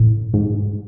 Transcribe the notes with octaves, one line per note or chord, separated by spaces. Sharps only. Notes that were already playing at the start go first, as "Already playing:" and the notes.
Already playing: A2
G#2